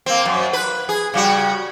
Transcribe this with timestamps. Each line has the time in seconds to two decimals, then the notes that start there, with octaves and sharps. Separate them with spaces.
0.06 A#3 C4
0.25 F#2
0.53 B4
0.89 G#4
1.14 C#3 G3 F#4